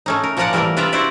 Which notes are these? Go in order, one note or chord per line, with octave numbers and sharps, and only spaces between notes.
A3 C#4 D#4
A#4
A#2 F3 A#3 A#4 D5 F#5
E3 G3 A3 A#3 A#4
C3 F4 B4 D5 E5 A#5
E4 F#4 C5 D5 E5